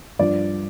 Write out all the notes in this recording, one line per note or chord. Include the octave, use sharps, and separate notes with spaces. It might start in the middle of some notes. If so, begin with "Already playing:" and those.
G2 F3 D5